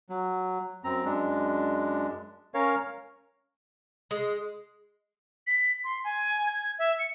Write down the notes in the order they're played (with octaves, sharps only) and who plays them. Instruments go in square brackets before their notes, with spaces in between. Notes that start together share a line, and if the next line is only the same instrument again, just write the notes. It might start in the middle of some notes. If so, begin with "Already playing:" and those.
[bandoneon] F#3
F#2 C4 A#5
F#2 G#3 D4
C#4 A#4 C#5 F5
[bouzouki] G#3
[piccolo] B6
C6
G#5
G#6
E5
C#7